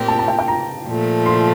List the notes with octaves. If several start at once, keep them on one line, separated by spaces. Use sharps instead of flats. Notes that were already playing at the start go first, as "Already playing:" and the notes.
Already playing: A#2 A3 C4 G4 A#4
A5
A5
G5
G5
A#5
A#2 F3 A3
C6